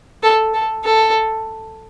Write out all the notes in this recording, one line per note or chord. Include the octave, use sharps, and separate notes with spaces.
A4
A4
A4